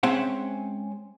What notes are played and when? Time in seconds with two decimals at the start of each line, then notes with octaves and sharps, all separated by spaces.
0.03 G#3 C4 C#4 E5 F#5